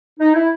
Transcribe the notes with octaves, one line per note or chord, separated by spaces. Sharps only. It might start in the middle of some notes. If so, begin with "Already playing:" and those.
D#4
E4